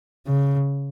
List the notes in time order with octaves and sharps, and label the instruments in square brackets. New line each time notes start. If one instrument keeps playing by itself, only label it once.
[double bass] C#3